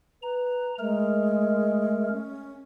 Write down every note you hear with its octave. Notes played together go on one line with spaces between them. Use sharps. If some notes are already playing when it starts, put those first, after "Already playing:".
B4 A#5
G#3 A3 A#4
C#4